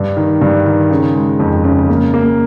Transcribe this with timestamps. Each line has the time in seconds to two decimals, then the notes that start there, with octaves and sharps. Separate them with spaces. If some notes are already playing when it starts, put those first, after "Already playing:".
Already playing: G2
0.17 D#3
0.41 G2
0.66 D#3
0.91 C#3
1.15 G#3
1.40 F2
1.64 C#3
1.89 A#3
2.14 A#3